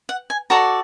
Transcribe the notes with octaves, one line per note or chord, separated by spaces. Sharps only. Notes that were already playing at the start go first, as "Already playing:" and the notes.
F#5
G#5
F#4 A4 D5 A#5